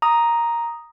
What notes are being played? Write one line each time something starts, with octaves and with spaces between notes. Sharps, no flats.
A#5 D#6